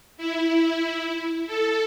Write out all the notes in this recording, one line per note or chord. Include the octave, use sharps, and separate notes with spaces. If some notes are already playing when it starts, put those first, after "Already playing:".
E4
A4